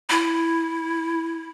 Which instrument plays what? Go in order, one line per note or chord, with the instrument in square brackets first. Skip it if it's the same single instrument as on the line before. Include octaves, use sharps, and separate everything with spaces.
[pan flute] E4